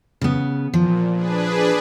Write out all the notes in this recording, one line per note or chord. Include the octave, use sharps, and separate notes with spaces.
C#3 B3
A#2 F3
D4 G#4 B4